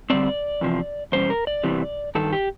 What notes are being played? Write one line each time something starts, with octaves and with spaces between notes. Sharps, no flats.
D3 G3 C4 D5
E2 C3 F3
E2 B2 G3 C#4 C5
A#4
D5
E2 C3 E3 G3
G2 D#3 A4
G4